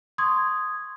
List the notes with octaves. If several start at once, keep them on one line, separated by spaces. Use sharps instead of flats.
C6 C#6 D#6 G#6